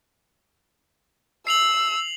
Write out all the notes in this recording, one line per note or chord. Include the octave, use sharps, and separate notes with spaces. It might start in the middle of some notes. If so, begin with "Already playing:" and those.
E6 C7 F7 F#7